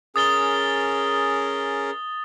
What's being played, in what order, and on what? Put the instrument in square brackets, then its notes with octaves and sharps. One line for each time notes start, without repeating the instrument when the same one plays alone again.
[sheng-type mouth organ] C#4 G#4 A#4 [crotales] D#6 A6 G7